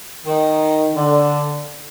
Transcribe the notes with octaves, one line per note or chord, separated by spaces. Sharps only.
D#3
D3